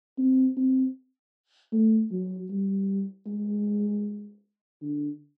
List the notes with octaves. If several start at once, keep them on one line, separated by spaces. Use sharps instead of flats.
C4
C4
A3
F#3
G3
G#3
D3